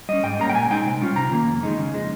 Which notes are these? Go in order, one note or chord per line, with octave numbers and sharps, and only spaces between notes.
G3 C#4 D#5
G#2 G5
G3 A#3 C#4 A#5
G5
A#2 G#5
G#3 D#4 G5
C3
G3 C#4 F4
C3 A#5
D#3 A#3
F2
D#3 G#3 D#4
C#3
F3 G#3